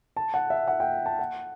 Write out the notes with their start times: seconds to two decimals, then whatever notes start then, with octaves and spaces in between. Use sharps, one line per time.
0.17 A5
0.34 F#5
0.50 E5
0.68 F#5
0.80 G5
1.06 A5
1.19 F#5